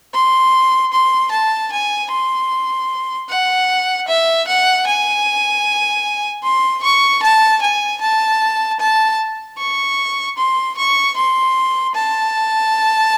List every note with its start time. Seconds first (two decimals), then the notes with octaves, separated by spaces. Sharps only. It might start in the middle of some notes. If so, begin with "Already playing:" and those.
0.14 C6
0.93 C6
1.32 A5
1.72 G#5
2.11 C6
3.29 F#5
4.08 E5
4.48 F#5
4.87 G#5
6.44 C6
6.83 C#6
7.23 A5
7.62 G#5
8.01 A5
8.80 A5
9.58 C#6
10.38 C6
10.77 C#6
11.16 C6
11.95 A5